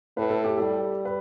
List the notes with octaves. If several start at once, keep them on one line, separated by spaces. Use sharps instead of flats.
A2 B4
A4
G4
G3 A4
B4